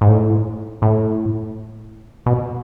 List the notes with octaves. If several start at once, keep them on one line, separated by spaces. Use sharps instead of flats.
G#2
A2
A2
B2